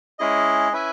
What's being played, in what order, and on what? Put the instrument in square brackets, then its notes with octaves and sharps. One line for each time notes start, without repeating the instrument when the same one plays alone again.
[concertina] G#3 C#4 E4 G#4 D#5
C#4 E4 B4 E5 G#5